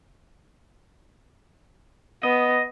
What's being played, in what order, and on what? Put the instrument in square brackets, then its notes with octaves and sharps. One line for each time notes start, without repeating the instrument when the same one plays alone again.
[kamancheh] B3 [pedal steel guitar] D#5